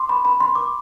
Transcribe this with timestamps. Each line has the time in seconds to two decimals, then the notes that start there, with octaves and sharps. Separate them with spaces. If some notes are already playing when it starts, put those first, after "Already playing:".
Already playing: C6 D6
0.09 B5
0.25 B5
0.40 C6
0.55 D6